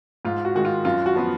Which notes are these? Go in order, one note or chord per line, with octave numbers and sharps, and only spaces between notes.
G#2 F4
F#4
D#3 G#3 F#4
F4
F#2 F4
F#4
F3 B3 F4